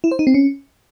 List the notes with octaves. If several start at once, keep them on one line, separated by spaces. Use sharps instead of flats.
E4
C5
D#4
C4
C#4